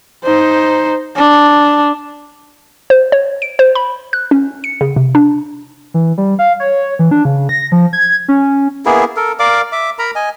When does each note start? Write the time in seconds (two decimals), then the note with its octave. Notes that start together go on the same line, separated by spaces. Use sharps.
0.24 D#4 C5
1.16 D4
2.90 C5
3.12 C#5
3.42 D7
3.59 C5
3.75 B5
4.13 F#6
4.31 C#4
4.64 C#7
4.81 C#3
4.96 C3
5.15 D4
5.94 E3
6.18 G3
6.39 F5
6.60 C#5
6.99 E3
7.11 D4
7.25 C#3
7.49 A#6
7.72 F3
7.93 G#6
8.28 C#4
8.86 A#3 B3 E4 G#4
9.16 A4 A#4
9.39 A#4 D5 F5 D6
9.72 E5 D6
9.99 A#4 A#5 B5
10.15 D#5 G#5